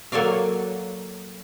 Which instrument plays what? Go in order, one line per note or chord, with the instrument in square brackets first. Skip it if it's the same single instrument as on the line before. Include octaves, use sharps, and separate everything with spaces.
[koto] F#3 A#3 A4 C#5 D5 F5